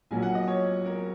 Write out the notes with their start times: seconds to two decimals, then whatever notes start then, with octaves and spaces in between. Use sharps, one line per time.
0.11 A#1 A#2 F#3 A#3 G#5
0.22 F#5
0.35 D#5
0.48 C#5
0.86 A#4